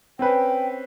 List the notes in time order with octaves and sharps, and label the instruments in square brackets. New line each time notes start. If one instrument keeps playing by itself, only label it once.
[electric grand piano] C4 C#4 B4 [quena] G5